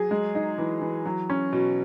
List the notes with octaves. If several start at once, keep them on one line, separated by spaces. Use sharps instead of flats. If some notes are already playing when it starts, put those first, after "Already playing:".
Already playing: F#3 G#4
G#3
D#4
E3
E3
F#3
C#4
B2